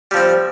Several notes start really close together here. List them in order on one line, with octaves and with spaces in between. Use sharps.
G3 F3 C4